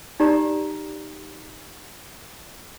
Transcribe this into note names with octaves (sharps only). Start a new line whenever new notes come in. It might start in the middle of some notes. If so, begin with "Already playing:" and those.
D#4 G4 D5 A#5